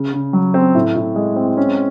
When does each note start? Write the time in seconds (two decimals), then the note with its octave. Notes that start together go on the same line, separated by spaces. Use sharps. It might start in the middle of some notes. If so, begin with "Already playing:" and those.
Already playing: C#3
0.13 C#3
0.33 F#3
0.54 C4
0.75 A2
0.96 A2
1.16 G#3
1.36 C4
1.57 C#4